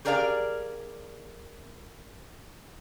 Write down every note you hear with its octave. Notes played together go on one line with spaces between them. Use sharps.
G4 G#4 A#4 D5 E5 F5